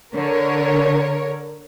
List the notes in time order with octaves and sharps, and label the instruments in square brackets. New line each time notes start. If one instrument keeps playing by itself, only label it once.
[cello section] D3 [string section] A#4 C#5